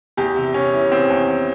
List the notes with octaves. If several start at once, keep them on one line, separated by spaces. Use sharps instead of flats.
E2 G4
C3
C3 C#4
E3
E2 C4
E2